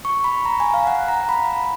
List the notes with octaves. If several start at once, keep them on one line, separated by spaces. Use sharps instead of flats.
C#6
B5
A#5
G#5
F5
F#5
A#5
B5